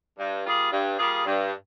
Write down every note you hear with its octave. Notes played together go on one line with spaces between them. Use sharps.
G2
G3 A#3 F4 G#4
G2
G3 A#3 F4 G#4
G2